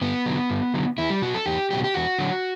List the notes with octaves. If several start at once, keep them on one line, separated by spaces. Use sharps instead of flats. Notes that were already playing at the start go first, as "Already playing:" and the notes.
G2 B3
D3 F#3
G2
D3 F#3
E2 E4
G3
B2 F#3 F#4
A4
E2 G4
B2 F#3 G4
G4
E2 F#4
D3 F#3